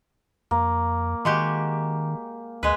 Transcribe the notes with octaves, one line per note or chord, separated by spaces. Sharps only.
F2 A#3
D#3 G#3 F#4 G4
D2 G#3 B4